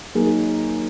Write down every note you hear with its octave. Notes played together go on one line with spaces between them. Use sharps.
F#3 A#3 D#4 G#4